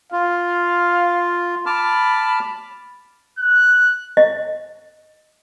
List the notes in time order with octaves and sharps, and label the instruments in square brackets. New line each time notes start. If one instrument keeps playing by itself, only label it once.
[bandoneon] F4 [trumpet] F5
[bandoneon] A5 D6 F6 [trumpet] B5
[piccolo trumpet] F#6
[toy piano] D#5